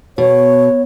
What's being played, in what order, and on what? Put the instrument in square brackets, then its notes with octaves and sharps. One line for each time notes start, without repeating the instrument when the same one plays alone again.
[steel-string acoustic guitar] B2 [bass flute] C#5